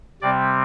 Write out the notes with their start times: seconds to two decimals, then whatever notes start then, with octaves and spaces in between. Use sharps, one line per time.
0.22 C3 G3 C4 D5